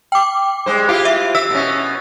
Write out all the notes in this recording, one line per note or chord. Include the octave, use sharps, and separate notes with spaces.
G5 D6
G3 G#3 C5
E4 F4 G4
E5
E5 E6
B2 C#4